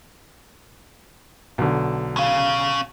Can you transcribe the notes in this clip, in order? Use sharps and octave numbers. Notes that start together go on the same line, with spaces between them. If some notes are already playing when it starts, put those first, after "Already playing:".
B1 D3
C#4 F5